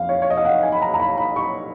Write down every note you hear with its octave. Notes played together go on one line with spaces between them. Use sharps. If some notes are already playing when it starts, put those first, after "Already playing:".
Already playing: F2 F5
C#5
C#5
D#5
F5
F#5
G#5
B5
A#5
A#5
B5
B5
C#6